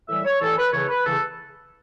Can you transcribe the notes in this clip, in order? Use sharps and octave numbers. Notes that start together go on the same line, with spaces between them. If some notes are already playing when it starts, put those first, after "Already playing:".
A2 E3 G3 E5
C#5
A2 E3 G3 A4
B4
E2 C#3 E3 A3 C#5
B4
E2 C#3 E3 A3 A4